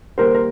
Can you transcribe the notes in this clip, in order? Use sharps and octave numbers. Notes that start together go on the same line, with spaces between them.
D#3 G3 A#3 A#4 C5
A#4